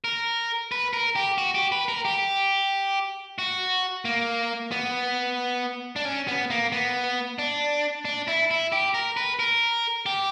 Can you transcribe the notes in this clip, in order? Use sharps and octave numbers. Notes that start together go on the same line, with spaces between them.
A#4
B4
A#4
G4
F#4
G4
B4
A#4
G4
F#4
A#3
B3
D4
C#4
B3
A#3
B3
D4
D4
E4
E4
G4
A#4
B4
A#4
G4